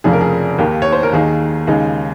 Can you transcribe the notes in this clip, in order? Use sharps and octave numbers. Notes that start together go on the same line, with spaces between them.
F1 F2 C#3 F3 G#4
A#4
G#4
D#2 D#3 A#3 G4
C#5
C5
A#4
D#2 D#3 A#3 D#4 G#4
D#2 C#3 G#3 D#4